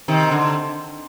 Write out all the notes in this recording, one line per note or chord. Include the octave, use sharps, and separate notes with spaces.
C3 D#3
D3